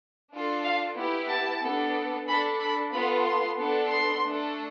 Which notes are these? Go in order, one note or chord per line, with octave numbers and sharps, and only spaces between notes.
D4 F4 A4
F5
B3 E4 G4
A5
B3 D4 A4
D4 A4 B5
B5
B3 F4 A4 B5
C6
B3 D4 A4
C6
A3 D4 A4